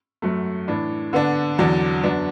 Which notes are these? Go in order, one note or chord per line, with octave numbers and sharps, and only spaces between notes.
F#2 F#3 A3
A2 E3 D4
D3 B3 D4
E2 D3 F#3 D4
F#2 F#3 B3 D4